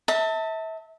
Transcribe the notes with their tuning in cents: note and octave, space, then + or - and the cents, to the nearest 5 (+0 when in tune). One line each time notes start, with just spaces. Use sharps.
E5 -30 A5 +25